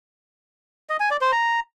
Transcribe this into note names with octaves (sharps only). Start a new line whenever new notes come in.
D#5
G#5
D5
C5
A#5